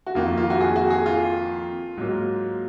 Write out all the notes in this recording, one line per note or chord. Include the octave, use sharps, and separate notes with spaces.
F#4
F2 D#3 A#3 F4
F4
F#4
G#4
F#4
G#4
F4
G#2 F#3 A#3